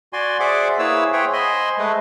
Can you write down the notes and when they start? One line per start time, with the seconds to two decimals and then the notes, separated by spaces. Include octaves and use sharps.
0.13 F#4 D5 G#5 C6
0.40 G#4 C5 D5 E5 F#5 D6
0.79 A#3 E4 G#4 B4 C#5 E6
1.13 G#4 C5 C#5 E5 F#5 G5
1.33 C5 D#5 G#5 B5 C6
1.78 G#3 A3 B4